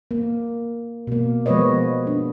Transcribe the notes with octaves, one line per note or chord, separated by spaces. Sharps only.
A#3
B2 A#3
F3 G#3 B3 B4 C#5 D#5
D4